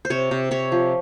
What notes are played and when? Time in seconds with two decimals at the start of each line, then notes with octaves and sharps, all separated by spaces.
0.05 C5
0.10 C3 C#5
0.31 C3
0.51 C3 C#5
0.72 F3